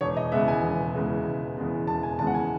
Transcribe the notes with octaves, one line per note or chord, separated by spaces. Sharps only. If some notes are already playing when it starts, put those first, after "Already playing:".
E1 C#5
D#5
E2 C#3 G#3 B3 E5
G#5
E1
E2 C#3 G#3 B3
E1
E2 C#3 G#3 B3
E1 A5
G#5
E2 C#3 G#3 B3 A5
F#5
G#5